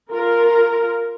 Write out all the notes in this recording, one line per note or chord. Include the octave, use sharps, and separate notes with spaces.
F4 A#4